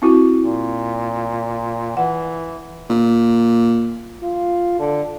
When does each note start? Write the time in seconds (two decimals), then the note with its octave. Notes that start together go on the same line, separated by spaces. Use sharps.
0.02 C4 E4 F#4
0.39 A#2
1.97 E3 F#5
2.90 A#2
4.23 F4
4.79 D3